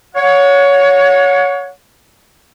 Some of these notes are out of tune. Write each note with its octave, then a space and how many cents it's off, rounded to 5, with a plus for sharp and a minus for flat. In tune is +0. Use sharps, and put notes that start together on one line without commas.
C#5 +15 F#5 -35